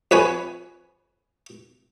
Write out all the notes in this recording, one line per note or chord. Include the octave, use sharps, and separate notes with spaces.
F2 B4 C#5 G#5